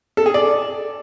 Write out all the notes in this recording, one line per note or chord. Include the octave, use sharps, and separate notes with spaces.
A4
G#4
D5